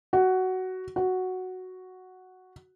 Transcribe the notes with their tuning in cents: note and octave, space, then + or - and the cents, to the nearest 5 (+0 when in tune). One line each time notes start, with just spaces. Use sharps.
F#4 +10
F#4 +0